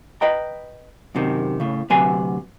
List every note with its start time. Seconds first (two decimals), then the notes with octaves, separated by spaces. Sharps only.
0.21 B4 D#5 G5 A#5
1.15 F#2 C3 D#3
1.60 A2 C#3
1.90 D2 C3 F#3 B4 G#5 C6